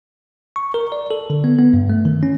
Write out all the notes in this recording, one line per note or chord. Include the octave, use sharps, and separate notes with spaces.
C#6
A#4
D5
A4
D3
B3
B3
G2
A3
D#3
C#4